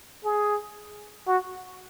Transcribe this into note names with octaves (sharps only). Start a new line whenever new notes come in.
G#4
F#4